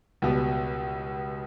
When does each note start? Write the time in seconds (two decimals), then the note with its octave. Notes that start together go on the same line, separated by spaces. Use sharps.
0.22 C#2 B2 G3 B3